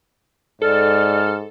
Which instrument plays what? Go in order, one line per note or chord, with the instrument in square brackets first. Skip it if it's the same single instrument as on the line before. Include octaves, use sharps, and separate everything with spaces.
[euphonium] G#2 [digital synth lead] A4 [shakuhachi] D5 [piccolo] F6